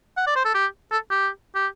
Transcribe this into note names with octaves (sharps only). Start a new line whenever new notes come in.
F#5
D5
C5
A4
G4
A4
G4
G4